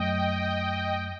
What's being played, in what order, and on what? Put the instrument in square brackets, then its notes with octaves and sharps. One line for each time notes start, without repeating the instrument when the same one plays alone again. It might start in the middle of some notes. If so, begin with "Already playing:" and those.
Already playing: [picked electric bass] F#2 F#3 A3 [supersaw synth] D#5 G5